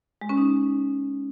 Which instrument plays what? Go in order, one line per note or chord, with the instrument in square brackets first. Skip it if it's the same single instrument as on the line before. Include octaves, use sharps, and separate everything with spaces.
[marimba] G#3
C#4
D#4